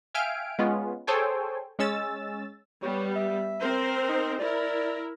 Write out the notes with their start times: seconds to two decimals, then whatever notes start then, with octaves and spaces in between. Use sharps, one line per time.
0.14 E5 F5 G5 G#5 F6 D7
0.59 G#3 B3 C#4 F4
1.07 G#4 A4 C5 C#5 G5 G#5
1.79 G#3 C#4 E6 A6
2.83 G3 B3 C#5
3.16 E5
3.60 C4 A#4 C5
4.09 D#4
4.40 E4 A#4 D5